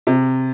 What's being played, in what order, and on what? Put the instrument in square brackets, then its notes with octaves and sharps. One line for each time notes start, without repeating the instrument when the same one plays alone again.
[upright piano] C3